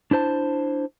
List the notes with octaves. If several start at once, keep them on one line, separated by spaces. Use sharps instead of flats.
D4 E4 C5 A5